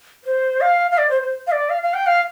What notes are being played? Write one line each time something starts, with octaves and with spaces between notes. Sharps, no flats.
C5
F5
F5
D5
C5
C5
F5
D5
F5
F5
G5
F5